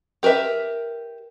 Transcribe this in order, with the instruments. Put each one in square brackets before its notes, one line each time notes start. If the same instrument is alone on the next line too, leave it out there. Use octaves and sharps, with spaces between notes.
[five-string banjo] G4 A#4 B4 E5